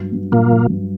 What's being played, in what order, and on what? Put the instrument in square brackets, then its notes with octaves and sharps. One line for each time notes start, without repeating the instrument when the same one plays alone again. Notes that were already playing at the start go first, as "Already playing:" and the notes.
Already playing: [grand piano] G2 F#3
G2
[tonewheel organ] A#2 A#3 [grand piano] F#3
[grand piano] F#3
G2